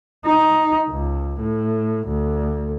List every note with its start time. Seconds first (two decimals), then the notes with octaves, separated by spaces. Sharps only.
0.25 D#4
0.89 C#2
1.40 A2
2.08 D2